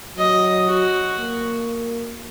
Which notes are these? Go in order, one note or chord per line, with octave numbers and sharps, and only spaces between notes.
F#3 D#5
F#4
A#3